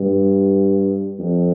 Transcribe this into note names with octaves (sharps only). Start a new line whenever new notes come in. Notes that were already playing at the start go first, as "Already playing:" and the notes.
Already playing: G2
F2